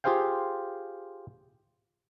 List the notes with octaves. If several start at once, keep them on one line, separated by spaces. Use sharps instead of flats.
F4 G4 G#4 C5 F5 G5